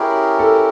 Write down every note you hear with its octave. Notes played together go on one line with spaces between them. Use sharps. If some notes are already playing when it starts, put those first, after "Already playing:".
Already playing: C#4 E4 G4 G#4 A#4
A4